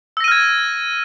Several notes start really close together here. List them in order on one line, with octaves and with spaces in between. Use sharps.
E6 A#6 D#7 F6 G#6